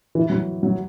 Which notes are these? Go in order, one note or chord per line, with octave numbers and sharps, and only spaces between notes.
E3
F#3
F#3